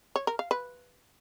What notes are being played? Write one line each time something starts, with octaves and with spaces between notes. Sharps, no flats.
C#5
A#4
F5
B4